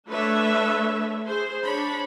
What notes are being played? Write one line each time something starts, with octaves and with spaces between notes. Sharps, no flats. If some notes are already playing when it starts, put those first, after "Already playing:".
A3 D4 B4 C#5 E5
G#4 C5
D4 C#5 B5